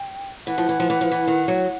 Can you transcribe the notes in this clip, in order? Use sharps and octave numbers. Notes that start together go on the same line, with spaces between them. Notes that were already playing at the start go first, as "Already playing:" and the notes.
Already playing: G5
E3 F#5
F3
E3
F3
E3
F3
E3
D#3
F#3